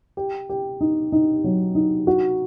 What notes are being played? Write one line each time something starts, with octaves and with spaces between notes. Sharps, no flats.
G4
G4
D#4
D#4
F#3
D#4
F#4